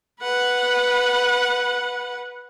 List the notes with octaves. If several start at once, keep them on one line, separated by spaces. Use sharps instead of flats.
B4 F#5